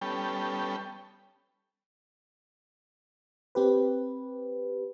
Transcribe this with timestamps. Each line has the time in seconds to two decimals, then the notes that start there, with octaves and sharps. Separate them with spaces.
0.02 G3 B3 C#4 A4 G5
3.55 C4 G4 B4